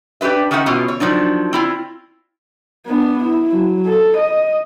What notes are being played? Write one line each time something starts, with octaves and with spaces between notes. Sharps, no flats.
D4 G4 A4 B4 E5
D#3 C#4 D#4 E5 F#5
B2 E3 C#4 F4
C#5
D#3 F3 F#3 D4
C4 E4 F4
B3 D4
E4
F#3
A4
D#5